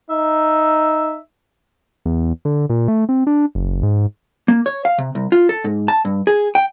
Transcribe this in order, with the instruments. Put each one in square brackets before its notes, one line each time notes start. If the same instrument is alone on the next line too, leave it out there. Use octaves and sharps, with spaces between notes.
[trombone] D#4 [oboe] E5
[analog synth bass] E2
D3
A#2
A3
C4
D4
F#1
G#2
[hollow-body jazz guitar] A#3
C#5
F5
C3
C2
F4
A4
G#2
A5
G2
G#4
G5